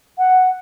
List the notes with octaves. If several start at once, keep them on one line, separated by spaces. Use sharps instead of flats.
F#5